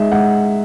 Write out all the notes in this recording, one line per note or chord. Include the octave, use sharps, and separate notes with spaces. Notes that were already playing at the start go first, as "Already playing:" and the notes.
Already playing: G#3 D#4 E5
G#3 F#5